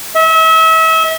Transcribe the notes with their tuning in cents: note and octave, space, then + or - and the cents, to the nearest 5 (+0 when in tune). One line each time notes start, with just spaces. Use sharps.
E5 -35